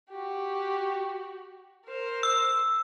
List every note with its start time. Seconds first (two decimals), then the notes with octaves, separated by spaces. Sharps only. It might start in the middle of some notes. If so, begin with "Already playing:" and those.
0.11 F#4 G4
1.86 A#4 C5
2.23 E6